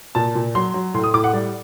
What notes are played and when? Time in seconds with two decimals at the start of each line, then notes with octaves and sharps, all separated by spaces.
0.15 A#2 A5
0.35 A#2
0.55 F#3 C6
0.74 F#3
0.94 A2 C6
1.03 D#6
1.13 A2 D6
1.24 F#5
1.33 G3 D5